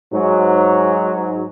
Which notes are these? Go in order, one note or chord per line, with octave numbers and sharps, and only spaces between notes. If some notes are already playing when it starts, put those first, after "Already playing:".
G#2 F#3